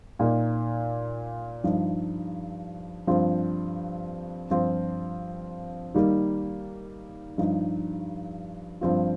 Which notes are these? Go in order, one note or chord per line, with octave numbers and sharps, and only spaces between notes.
A#2 A#3 D#4
G2 F3 D#4
G2 F3 C4 F4
G2 F3 C4 F4
D#3 G3 A#3 D#4
G2 F3 D#4
G2 F3 C4 F4